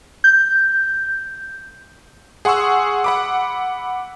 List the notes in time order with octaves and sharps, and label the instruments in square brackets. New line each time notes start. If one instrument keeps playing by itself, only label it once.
[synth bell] G6
[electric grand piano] G#4 F#5 C6 C#6 E6
F#5 B5 D6